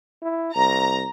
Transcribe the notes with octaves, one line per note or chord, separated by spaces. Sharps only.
E4
C2 A#5